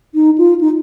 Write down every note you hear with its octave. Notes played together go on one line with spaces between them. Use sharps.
D#4
F4
D#4